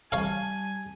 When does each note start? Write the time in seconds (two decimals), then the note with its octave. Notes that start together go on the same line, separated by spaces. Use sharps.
0.12 G3 C#5 F5 G#5 A5